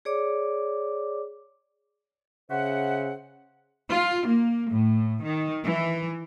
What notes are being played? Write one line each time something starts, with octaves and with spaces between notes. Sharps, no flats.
G#4 C#5 D5 D6
C#3 C5 E5 F#5
F4
A#3
A2
D#3
E3